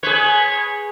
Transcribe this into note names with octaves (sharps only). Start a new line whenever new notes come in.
G#4 B4 C#5